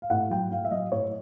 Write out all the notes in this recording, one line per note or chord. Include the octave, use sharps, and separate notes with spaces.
F5
A2 F#5
F#3 G5
A2 F5
E5
F#3 D#5
A2 C#5